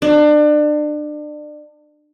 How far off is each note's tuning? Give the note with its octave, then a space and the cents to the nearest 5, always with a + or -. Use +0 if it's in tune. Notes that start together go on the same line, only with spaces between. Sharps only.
D4 +30